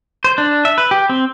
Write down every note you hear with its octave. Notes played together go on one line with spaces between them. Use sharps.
C5
D4
E5
B4
G4
C4